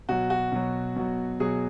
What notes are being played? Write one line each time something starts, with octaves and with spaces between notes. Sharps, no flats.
B2 F#3 F#4
F#4
B2 F#3
B2 F#3
B2 F#3 G#4